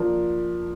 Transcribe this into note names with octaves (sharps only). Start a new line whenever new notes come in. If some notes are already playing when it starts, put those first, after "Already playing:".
Already playing: F3 A#3 D4